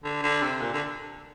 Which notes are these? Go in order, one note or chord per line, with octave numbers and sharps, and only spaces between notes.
D3
D3
C3
A#2
D3